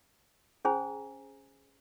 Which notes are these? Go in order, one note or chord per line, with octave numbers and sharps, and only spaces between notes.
C#4 G#4 C5 G#5 A#5